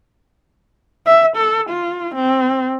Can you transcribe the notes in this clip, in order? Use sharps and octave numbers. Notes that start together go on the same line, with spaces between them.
E5
A4
F4
C4